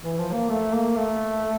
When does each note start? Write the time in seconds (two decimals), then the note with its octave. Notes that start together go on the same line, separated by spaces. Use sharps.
0.03 E3
0.18 F3
0.33 A#3
0.49 A3
0.73 A#3
0.96 A3